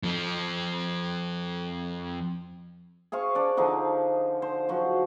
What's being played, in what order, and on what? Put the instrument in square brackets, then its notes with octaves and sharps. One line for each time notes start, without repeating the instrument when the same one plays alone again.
[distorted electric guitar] F2 F3
[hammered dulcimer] G#4 C5 F5 C#6
D4 D5
D3 F3 D#4
C5
F3 F#3 F#4